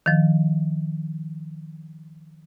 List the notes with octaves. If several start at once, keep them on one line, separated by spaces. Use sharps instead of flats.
D#3 F3